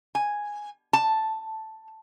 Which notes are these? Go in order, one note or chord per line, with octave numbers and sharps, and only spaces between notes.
G#5
A5